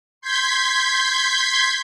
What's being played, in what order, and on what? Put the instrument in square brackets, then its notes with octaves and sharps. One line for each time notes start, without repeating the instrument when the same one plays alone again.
[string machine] C6 G6 G#6 B6